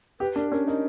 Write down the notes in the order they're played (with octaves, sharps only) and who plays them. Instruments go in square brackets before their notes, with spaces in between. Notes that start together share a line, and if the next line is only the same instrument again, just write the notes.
[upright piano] G4 [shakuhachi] B4
[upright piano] D4 [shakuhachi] A#4
[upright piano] C#4 [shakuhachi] A#4
[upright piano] D#4 [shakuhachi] A#4